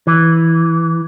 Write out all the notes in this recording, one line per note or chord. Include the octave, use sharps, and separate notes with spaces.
E3